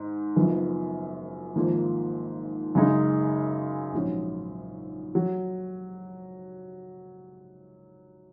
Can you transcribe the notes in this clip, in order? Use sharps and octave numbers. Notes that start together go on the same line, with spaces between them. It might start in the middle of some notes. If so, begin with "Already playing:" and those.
Already playing: G#2
F#1 F#2 F3 B3 D#4
G#1 G#2 F3 A#3
F#2 C#3 G#3 D#4
A#1 G#2 F#3 C#4
F#3